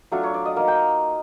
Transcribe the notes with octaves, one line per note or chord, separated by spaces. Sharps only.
F#3 A3 D4 F4 C#5
C#5
D5
D#5
A#3 D#4 F5
G5